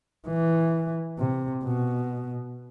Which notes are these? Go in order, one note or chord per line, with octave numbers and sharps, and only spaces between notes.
E3
C3
B2